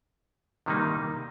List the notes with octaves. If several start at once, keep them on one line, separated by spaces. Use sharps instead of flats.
C3 D#3 G3 A#3 D#4